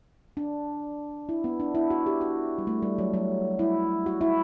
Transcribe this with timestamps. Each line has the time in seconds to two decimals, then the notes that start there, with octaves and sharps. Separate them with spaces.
0.37 D4
1.29 E4
1.44 B3
1.60 D4
1.75 E4
1.90 F#4
2.06 G4
2.21 F#4
2.58 G3
2.67 A3
2.82 G3
2.98 F#3
3.14 F#3
3.59 E4
4.06 F#4
4.21 E4